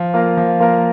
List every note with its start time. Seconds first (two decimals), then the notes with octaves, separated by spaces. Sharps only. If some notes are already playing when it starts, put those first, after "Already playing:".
Already playing: F3
0.13 A#3 F4 A#4
0.37 F3
0.60 A#3 F4 A#4